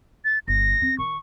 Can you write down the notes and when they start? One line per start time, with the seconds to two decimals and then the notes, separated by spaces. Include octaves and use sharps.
0.25 A6
0.48 G1 A#6
0.81 C4 C#4
0.99 D#3 C#6